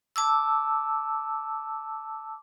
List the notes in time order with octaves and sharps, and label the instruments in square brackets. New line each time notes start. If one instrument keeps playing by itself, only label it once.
[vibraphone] A5 D6 E6